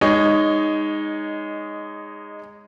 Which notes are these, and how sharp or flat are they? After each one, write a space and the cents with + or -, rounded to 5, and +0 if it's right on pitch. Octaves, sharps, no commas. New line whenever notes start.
G#3 -15 D#4 +0 C#5 +10